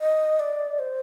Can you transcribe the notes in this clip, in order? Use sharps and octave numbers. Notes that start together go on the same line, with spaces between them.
D#5
D5
C5